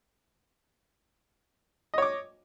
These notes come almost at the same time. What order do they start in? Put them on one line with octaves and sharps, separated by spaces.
D#5 C#5 D6